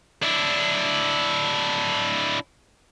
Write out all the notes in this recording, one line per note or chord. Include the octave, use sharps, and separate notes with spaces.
D4 E4